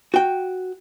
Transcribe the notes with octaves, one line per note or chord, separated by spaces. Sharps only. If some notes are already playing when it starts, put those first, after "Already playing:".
F#4 G5